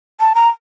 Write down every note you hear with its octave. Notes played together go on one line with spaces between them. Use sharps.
A5
A#5